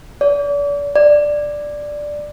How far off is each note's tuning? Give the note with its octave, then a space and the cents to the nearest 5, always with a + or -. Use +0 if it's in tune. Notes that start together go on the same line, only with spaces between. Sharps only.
D5 -40
D5 +5